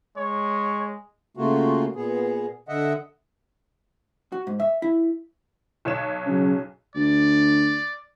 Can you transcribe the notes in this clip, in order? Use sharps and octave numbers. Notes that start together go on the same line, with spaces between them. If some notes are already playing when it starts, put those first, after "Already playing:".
G#3 C#5
C#3 A3 A#3 F4 F#4
A#2 B3 G#4
D3 D#5 E5 F#5
F#4
G#2
E5
E4
B1 C#5 E7
C#3 F#3 C#4
D2 D5